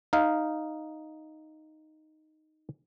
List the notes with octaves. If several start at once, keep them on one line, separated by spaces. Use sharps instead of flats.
D#4 F5